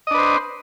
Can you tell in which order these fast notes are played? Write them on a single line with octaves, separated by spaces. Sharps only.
D#5 D4 B4 C5